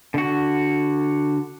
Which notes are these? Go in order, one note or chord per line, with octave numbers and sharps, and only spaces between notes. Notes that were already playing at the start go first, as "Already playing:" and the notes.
D3 F#4